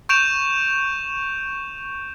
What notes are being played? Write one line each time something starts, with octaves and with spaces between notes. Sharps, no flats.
C#6 G6 D7 E7 F7